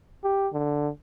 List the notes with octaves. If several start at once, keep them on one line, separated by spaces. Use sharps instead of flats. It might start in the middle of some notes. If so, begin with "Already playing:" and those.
G4
D3